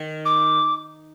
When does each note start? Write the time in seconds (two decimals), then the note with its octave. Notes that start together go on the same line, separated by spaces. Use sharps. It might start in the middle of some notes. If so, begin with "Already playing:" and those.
Already playing: D#3
0.26 D6